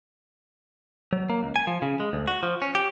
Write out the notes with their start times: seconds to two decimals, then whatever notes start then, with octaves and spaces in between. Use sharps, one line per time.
1.13 F#3
1.30 A#3
1.43 C#2
1.56 G#5
1.67 F3
1.82 C#3
2.00 G#3
2.13 D2
2.28 F#4
2.43 F3
2.62 C#4
2.75 G4